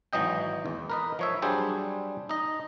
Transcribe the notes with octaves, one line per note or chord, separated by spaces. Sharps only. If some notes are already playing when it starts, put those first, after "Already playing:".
G#1 E3 F#3 D#5 G5
E2
A#4 B4 D#5
F3 C#5 E5
F#3 G3 D4 G#4 C5
D#4 D#5